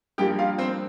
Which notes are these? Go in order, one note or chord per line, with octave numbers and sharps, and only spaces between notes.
G2 F3 A#3 G4 G5
F4 F5
C4 C5